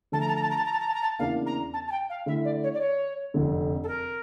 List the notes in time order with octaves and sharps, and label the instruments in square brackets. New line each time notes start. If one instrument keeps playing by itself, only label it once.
[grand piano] D3 F3 A3 [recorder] A5
[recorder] A#5
A5
A#5
A5
A#5
A5
A#5
A5
A#5
A5
A#5
A5
[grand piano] E2 C#3 E3 A#3 D4 [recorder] F5
[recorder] A#5
A5
A5
G5
F5
[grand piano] D3 A3 E4 [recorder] E5
[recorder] D5
C#5
D5
C#5
[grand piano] F1 F2 D3
[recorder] A4
A#4